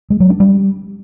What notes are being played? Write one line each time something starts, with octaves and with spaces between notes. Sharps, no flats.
G#3
F#3
D4
G3